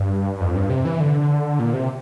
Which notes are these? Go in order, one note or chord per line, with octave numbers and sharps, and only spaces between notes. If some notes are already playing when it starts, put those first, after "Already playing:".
Already playing: G2
F2
G2
C3
E3
D3
A#2
C3